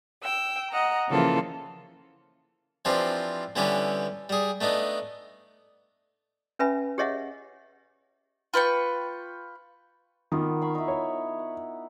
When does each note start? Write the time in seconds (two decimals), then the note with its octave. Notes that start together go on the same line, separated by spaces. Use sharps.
0.22 G5 E6
0.70 D#5 F#5 A#5
1.09 C#3 E3 F3 A#3 F4 A4
2.85 E3 F3 C4 D4 G4
3.56 D3 E3 G3 B3 C#4 G4
4.29 G3 G#4
4.61 A3 B3 D4 D#4
6.59 C#4 B4 E5 G#5 B5
6.98 G4 G#4 C#5 D#5 E5 F#5
8.54 F4 B4 G5 C#6
10.32 D#3 A#3 B3 F4
10.61 F5 B5 C#6
10.75 D#4 E4
10.88 C#5
11.39 F#5